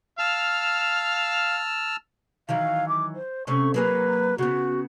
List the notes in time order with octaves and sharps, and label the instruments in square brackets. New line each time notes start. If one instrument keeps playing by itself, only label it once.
[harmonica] F5 [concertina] A5 E6 F6
[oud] D#3 E3 F#3 [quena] F5
[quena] D6
C5
[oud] C3 A3 C#4 [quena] C#6
[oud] F#3 A#3 G#4 [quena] B4
[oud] C#3 B3 [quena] F#4